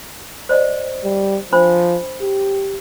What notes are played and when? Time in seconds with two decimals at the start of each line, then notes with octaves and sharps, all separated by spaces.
0.49 C5 D5 D#5
1.04 G3
1.53 F3 D4 C5 B5
2.22 G4